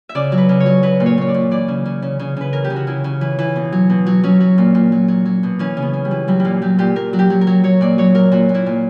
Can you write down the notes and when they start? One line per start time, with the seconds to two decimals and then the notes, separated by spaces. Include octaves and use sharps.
0.09 E5
0.15 C#3 D5
0.32 F#3
0.38 B4
0.49 C#3
0.60 C#5
0.66 F#3
0.83 F#3 B4
1.00 A#2
1.06 C#5
1.17 A#2 C#5
1.29 D5
1.34 A#2
1.51 E3 D5
1.68 C#3
1.85 C#3
2.02 C#3
2.19 C#3
2.37 C#3 B4
2.53 E3 A#4
2.64 G4
2.70 C#3
2.76 F#4
2.87 C#3 E4
3.04 C#3
3.21 E3
3.39 E3
3.56 B2
3.72 F#3
3.90 B2
4.06 F#3
4.23 F#3 C#4
4.40 F#3
4.58 A#2
4.75 A#2
4.92 F#3
5.08 F#3
5.25 F#3
5.43 B2
5.59 E3 C#4
5.77 C#3
5.82 B3
5.93 C#3
6.05 G3
6.11 E3
6.28 F#3 G3
6.40 G3
6.45 A#2 A#3
6.62 F#3 G4
6.79 A#2 G4
6.96 A#2 A#4
7.13 F#3
7.19 G4
7.30 F#3
7.41 A#4
7.47 F#3
7.64 F#3 C#5
7.81 A#2 D5
7.98 F#3 C#5
8.15 F#3 A#4
8.32 A#2 F#4
8.49 A#2
8.54 E4
8.66 A#2